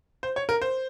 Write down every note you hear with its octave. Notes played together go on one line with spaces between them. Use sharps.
C5
C#5
A#4
C5